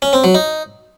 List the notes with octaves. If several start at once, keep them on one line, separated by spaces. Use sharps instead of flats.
C#4
C4
F#3
D#4